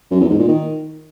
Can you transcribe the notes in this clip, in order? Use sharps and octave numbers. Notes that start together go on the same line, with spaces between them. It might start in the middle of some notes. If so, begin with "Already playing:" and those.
F#2
E2
G#2
A#2
D#3